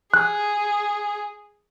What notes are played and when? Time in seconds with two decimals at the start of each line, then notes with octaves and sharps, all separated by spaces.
0.14 G#4 F#6